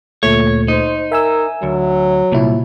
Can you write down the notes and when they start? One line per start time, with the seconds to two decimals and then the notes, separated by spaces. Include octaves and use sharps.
0.23 D2 A#2 A3 C#5
0.68 D#4 C5
1.12 A#4 E5 G#5 E6
1.63 D2 F#3
2.32 C2 A#2 E4